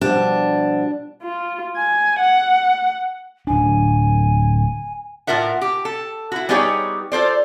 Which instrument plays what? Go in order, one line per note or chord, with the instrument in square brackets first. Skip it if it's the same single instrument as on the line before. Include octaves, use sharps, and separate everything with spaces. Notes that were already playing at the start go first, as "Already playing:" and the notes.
[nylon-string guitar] B2 F3 G3 [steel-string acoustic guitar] D4
[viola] F4
G#5
F#5
[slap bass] D1 D4 [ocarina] G#5
[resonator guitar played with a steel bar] A2 F4 A#4 E5 F#5
G4
A4
E4 F#4
G3 B3 D#4 G4 G#4 C#5
F4 A4 C5 D5